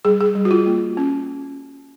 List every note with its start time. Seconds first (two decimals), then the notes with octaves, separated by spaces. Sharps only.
0.05 G3 G#4
0.20 G#4
0.35 G3
0.45 F#4
0.51 F4
0.66 A#3
0.97 C#4